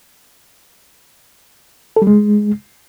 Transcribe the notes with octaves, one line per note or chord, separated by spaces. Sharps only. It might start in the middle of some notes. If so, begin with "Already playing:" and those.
A4
G3
G#3